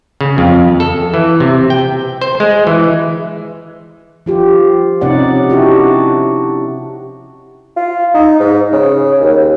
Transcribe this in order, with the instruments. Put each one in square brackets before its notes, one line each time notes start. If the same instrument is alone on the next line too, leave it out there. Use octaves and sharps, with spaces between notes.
[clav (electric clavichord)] C#3
F2
A4
E3
C3
G5
C5
G#3
E3
[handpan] F3 F4 G4
C3 C#4 D#4 D5 F#5
D4 E4 F#4 G4
[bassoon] F4
D#4
G#2
C#3
D#2